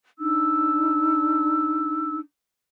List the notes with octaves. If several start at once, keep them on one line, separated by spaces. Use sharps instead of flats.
D4 D#4 E6